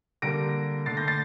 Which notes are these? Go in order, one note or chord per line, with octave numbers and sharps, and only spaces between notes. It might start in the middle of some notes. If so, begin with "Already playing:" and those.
D3 G3 A#3 A#6 D7
D3 A3 A6 C7
G6 A#6
A6 C7